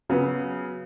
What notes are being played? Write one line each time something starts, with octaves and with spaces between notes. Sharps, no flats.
C#3 F#3 B3